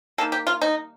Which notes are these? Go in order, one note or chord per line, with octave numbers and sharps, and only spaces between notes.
D#3 G3 A#3 A4
G4
F4
D#4